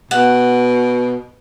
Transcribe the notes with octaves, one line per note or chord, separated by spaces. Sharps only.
B2 F#5